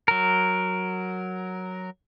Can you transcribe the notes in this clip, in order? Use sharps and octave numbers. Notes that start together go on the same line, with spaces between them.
F#3 A#4